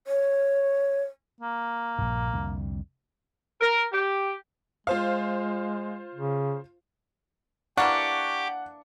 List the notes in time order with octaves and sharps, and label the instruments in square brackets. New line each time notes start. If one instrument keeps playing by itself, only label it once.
[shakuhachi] C#5
[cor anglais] A#3
[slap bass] A#1 G2
C2 F2 D3
[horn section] A#4
G4
[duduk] G#3 [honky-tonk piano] F4 C5 F5
[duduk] C#3
[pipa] E3 A#3 D4 [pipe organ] G4 D6 [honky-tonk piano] F#5 [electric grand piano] C#6